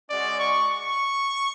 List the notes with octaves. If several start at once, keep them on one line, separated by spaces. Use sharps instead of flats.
G#3 C#4 F#4 D5
C#6
C#6